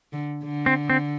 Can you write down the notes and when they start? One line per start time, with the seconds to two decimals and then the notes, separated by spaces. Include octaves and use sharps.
0.13 D3
0.44 D3
0.66 C4
0.90 C4